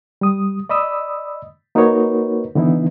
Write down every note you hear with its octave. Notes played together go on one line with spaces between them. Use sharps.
G3 D#6
D5 D#5 B5 D#6 E6
A#3 D#4 F#4 A#4 B4 C#5
D3 E3 B3 D#4 E4